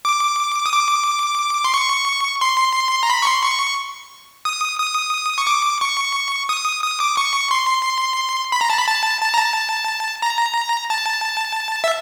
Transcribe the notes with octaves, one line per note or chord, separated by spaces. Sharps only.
D6
D#6
D6
C6
C#6
C6
A#5
B5
C#6
C6
C#6
D#6
D#6
C#6
D6
C#6
D#6
D#6
D6
C#6
C6
B5
A#5
A5
B5
A5
A5
A#5
A5
A#5
A5
E5